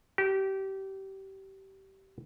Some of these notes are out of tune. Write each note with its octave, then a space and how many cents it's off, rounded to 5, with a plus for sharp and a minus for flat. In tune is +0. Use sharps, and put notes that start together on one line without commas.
G4 -25